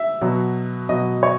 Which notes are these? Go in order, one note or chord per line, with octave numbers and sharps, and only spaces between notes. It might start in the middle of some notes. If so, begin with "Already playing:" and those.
Already playing: E5
B2 F#3
B2 F#3 D#5
C#5